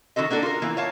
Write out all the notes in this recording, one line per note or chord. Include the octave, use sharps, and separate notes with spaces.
D#3 F4 F#4 A4 D#5
A#3 D4 F#4 A4
F4 A#4
E3 A#3 B3
C#5 F5 A5